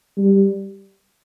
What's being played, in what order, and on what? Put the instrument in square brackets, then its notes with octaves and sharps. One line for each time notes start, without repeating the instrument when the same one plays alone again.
[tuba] G3